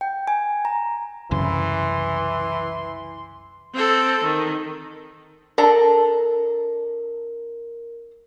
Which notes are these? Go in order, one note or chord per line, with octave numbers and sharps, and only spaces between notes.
G5
G#5
A#5
C2 F#2 C#3 E3 C6
C4 A4
D#3
D4 A4 A#4 A#5